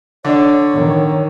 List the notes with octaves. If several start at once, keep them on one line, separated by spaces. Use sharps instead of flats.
D3 D4 C#5
D#3